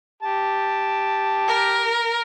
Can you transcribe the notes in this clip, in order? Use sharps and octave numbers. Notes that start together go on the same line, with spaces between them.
G4 A5
A#4